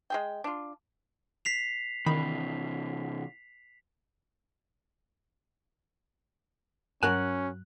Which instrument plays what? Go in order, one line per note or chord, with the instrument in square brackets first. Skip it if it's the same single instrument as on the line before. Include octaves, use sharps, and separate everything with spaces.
[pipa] G#3 G#4 G5
D4 F4
[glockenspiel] B6 C7 F7
[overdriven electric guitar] C3 E3 [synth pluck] D#3 B5
[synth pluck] G2 F#3 [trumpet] C#4 [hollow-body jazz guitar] F#4 A#4 G#5 [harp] F#6